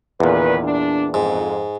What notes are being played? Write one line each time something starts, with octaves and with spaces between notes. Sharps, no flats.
E2 A#2 D3 D#3 B4
D4
F2 G#2